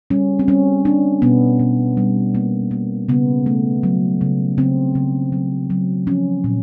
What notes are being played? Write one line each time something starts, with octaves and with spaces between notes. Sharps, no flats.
G3 C#4
C4
G3 C#4
A#3 D4
B2 B3
B2
G3
A#3
A#3
C#3 B3
A3
F#3
C#3
C#3 C4
C#3
F#3
F#3
F3 C#4
A#2